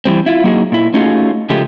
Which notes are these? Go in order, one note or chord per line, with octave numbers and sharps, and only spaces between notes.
E3 G3 C4
E4 F4
F#3 A#3 D#4 F#4 G#4
A#2 E4
A3 C#4 D#4 F4 F#4 G#4
C#3 F3 G#3 A3 G4